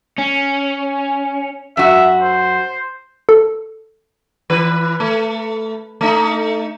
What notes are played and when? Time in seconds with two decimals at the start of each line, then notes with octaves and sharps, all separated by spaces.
0.19 C#4
1.77 F#2 F#4 E5
2.21 C5
3.29 A4
4.50 E3 B4
5.00 A3
6.01 A3 D#4